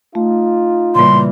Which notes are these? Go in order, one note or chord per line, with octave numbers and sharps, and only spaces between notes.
A3 D#4 F4
A#2 C#3 E3 G3 C6